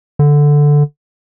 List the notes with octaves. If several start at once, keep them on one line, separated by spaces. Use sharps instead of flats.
D3